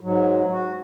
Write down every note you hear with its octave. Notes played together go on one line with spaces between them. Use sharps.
G#2 F#3
F#4